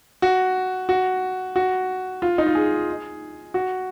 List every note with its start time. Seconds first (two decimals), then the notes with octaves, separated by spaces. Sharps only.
0.22 F#4
0.89 F#4
1.56 F#4
2.22 F4
2.38 D#4
2.47 F4
2.55 G#4
3.54 F#4